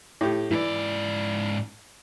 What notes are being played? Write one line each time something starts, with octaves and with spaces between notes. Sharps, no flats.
A2 G4
G#2 E3 D5